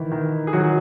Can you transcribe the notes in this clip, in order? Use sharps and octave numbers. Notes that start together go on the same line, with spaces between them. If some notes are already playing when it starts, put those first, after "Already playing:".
Already playing: D#3 E3 E4
D#3
G#4
D#3 F#3 F#4